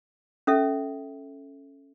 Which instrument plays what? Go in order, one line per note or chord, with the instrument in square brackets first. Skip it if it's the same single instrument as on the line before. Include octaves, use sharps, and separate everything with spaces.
[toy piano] C#4 A4 E5